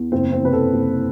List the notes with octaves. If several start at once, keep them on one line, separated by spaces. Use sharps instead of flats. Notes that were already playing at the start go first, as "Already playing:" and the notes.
Already playing: E2
F#1 C4
C4
C3 B4
A4
F#1